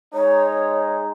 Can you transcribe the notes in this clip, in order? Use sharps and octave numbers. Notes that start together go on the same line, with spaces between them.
G#3 D#4 C#5